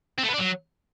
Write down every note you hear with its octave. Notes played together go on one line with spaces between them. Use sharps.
C4
A3
B3
D4
F#3